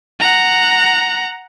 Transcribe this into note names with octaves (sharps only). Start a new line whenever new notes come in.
F#5 A#5